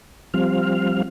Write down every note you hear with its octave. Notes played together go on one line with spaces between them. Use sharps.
F3 G3 C4 F5